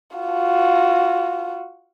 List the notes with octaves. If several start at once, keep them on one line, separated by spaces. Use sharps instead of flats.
F4 F#4